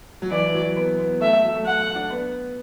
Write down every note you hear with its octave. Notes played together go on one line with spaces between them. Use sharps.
F#3
E3 D5
E3
F#3
B3
B3
A3 E5
A3
F#3
A3
A3 F#5
D4
B3